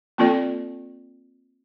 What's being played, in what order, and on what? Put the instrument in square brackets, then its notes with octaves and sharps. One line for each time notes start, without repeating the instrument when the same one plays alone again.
[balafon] A#3 C4 F4 A4 D5 G5